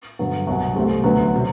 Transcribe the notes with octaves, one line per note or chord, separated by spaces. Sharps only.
G2 D3 F#3 B3
C2 B2 F#3
C2 B2 A3 C4 G4
D2 D3 F#3 B3
C3